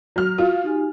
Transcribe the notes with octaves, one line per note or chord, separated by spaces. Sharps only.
F#3 F6
F4 F#4 F5
D#4 G4 G#5